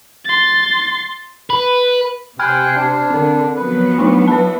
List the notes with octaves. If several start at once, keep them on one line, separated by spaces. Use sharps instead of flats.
C6 A6
B4
C3 C5 G5 G#5 B5 F6 F#6 G#6
D4
D3 C4 A#4
F3 F#3 B3 B4
A3 D4 D#4
E4 B4 A5